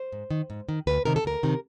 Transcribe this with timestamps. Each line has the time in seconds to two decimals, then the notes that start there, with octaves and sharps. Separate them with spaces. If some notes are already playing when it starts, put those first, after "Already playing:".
Already playing: C5
0.12 G#2
0.31 D#3
0.50 G#2
0.69 D#3
0.87 D2 B4
1.05 C3 D#3 A#4
1.16 A4
1.25 D2 A#4
1.43 C3 D#3